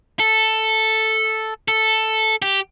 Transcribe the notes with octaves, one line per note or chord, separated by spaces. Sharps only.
A4
A4
G4